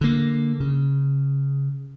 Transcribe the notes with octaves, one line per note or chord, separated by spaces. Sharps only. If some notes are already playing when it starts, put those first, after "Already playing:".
D3 A#3
C#3